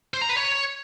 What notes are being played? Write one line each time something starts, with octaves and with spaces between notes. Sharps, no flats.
C5
A#5
B4
C#5